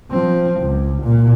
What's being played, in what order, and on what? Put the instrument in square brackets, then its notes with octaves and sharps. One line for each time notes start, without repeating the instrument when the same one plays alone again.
[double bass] F3 C4
C#2
A#2